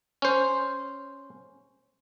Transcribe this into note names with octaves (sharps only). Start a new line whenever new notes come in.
C#4 C5